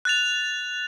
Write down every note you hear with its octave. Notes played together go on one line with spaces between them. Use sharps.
F#6 A6 F7